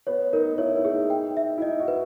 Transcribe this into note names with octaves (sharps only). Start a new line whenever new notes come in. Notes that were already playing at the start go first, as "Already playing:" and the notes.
B3 C#5
D#4 A#4
E4 C#5
E4
G#4
D#4
G5
E5
E4
D#4 D#5
F#4
B4